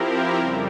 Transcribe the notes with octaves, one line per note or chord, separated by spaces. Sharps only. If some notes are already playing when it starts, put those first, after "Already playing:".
Already playing: F3 C4 E4 G4 A#4
F2 C#3 G3